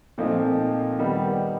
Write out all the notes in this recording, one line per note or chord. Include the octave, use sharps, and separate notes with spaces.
A#2 F3 A3 C4 D#4
D#3 G3 B3 D#4